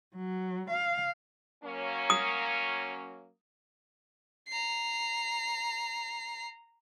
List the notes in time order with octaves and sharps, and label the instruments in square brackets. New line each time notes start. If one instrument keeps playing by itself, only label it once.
[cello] F#3
F5
[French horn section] F#3 A#3 C#4
[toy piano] D#6
[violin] A#5 C7